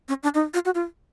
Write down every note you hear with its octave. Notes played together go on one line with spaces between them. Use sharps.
C#4
D4
D#4
F4
F#4
F4